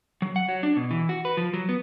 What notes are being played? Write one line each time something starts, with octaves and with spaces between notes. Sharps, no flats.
F#3
F#5
F#3
D4
B2
E3
F#4
B4
F3
F#3
B3